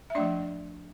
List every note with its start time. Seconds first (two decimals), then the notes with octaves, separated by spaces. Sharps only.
0.10 E5
0.15 F3 A3 D4 D5